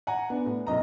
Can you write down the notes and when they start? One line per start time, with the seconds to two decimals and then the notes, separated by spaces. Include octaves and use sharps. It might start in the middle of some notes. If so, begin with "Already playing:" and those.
0.07 F#5 G#5 A#5
0.30 B3 D4
0.46 A2
0.67 B1 F#2 D#5 A#5